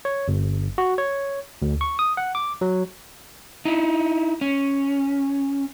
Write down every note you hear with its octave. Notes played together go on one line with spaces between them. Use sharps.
C#5
G1
F#4
C#5
D2
C#6
D#6
F#5
D6
F#3
D#4 E4
C#4